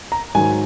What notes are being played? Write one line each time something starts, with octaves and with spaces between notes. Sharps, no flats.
A#5
G#2 D#3 F#3 G#5